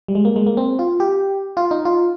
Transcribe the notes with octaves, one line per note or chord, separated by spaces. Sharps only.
G3
G#3
A#3
G#3
A#3
C4
F4
G4
F4
D#4
F4